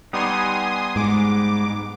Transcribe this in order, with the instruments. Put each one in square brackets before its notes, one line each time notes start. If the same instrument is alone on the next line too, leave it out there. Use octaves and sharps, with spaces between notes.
[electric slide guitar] G3 B3 D#4 [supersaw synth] G#5 C6 D#6
[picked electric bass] G#2 [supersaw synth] D6